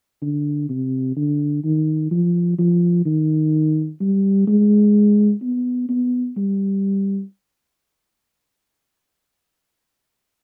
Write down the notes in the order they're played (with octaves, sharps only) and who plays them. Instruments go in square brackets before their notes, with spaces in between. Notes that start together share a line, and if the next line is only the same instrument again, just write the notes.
[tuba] D3
C3
D3
D#3
F3
F3
D#3
G3
G#3
B3
B3
G3